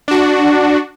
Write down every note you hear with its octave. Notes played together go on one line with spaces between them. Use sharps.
D4 F#4